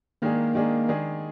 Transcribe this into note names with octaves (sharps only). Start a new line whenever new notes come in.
D#3 G#3 A#3 D4 G#4
D#3 G#3 D4 G#4
D#3 G#3 D4 G#4